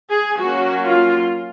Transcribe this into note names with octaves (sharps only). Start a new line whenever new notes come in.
G#4
F#3 A#3 C#4 F#4
F4